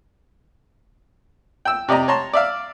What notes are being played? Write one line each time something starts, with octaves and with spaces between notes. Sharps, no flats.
G5 E6
C3 D5 D#5 A#5
C#5 A5 A#5 C6
D5 E5 F5